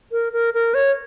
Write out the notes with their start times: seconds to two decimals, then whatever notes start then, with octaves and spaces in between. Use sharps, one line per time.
0.12 A#4
0.33 A#4
0.54 A#4
0.74 C#5